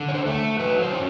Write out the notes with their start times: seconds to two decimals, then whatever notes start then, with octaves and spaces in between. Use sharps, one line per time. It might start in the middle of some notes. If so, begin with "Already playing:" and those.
Already playing: D3
0.09 C#5
0.14 C5
0.26 A3
0.59 F#3 B4
0.82 C5
0.93 C#4